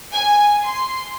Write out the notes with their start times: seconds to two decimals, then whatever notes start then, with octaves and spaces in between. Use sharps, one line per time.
0.12 G#5
0.63 C6